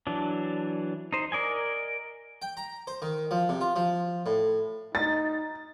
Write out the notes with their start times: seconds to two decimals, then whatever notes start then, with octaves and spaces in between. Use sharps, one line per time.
0.07 E3 F#3 D4
1.13 D#4 C5
1.32 A#4 D5 D#5 G#5
2.42 G5
2.57 A#5
2.87 C5
3.02 D#3
3.31 F3
3.49 C3
3.61 F4
3.76 F3
4.26 A2
4.95 D#4 A6